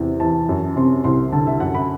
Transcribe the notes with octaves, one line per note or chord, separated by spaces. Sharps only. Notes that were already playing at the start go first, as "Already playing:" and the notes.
Already playing: E2 C3
E3 A5
F#2
C3 C6
C2 C6
D3 A5
E5
F#2 F#5
B5